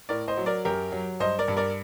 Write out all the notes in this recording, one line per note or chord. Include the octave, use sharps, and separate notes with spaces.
A2 A#4 D5
C5 D#5
F#3
A#4 D5
F#2 G4 A#4
F#3
G2 C5 D#5
A#4 D5
G2
A#4 D5